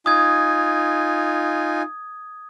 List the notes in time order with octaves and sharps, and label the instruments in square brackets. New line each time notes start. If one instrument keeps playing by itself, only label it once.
[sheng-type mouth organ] D#4 F4 G#5 [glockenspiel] D#6 G#6